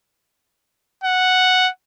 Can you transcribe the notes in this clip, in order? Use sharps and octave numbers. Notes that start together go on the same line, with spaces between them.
F#5